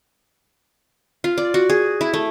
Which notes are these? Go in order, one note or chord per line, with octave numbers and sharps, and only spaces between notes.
F4
D5
F#4
G#4
E4
A3